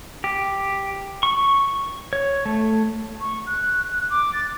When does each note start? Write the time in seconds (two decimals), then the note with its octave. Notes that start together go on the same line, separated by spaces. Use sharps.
0.24 G4
1.23 C#6
2.13 C#5
2.46 A3
3.21 C#6
3.46 F#6
4.10 D6
4.33 A6